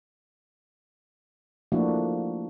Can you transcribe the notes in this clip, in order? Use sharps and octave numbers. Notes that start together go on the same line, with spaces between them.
F3 A3 A#3 D4 E4 F#4